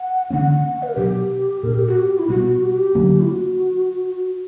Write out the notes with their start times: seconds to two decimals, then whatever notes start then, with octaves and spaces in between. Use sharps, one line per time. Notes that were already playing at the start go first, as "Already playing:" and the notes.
Already playing: F#5
0.30 D3 F#3 A#3 C#4 F#5
0.83 B4
0.89 A#4
0.96 B2 F#3 B3 D4 G4
1.63 A#2 A#3 D4 A#4
1.74 G4
1.87 F#4
1.99 G4
2.19 E4
2.28 B2 G3 B3 F#4
2.62 G4
2.69 F#4
2.77 G4
2.95 D3 F#3 A#3 C#4
3.20 E4
3.27 F#4